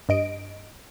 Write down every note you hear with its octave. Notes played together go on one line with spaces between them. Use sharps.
G2 D#5 D7